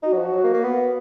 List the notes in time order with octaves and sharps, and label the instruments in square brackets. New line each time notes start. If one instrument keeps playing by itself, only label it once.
[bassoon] D#4 [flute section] F#4
[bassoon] F#3
F3
F#3
A#3
A#3
B3